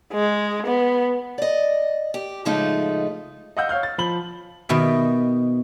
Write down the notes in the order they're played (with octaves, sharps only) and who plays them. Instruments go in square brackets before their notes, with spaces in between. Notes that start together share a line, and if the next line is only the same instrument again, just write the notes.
[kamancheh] G#3
B3
[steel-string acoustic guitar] D5 D#5
G4
A2 C#3 F3 G#3 A3 D#4
[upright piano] D#5 F5 F#5 E6 G6
C#5 F5 F6 G6
A6
F3 B5 F#7 G7
[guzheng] B2 D#3 E5